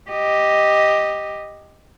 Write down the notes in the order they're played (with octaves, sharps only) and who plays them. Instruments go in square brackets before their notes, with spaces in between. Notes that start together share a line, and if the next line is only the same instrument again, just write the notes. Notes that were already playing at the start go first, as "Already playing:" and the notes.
[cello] G4 D#5